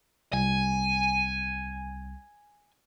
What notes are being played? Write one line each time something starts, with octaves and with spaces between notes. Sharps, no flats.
C2 G#5